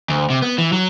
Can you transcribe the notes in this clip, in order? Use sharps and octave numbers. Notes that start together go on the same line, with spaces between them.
D2
C3
B3
E3
F#3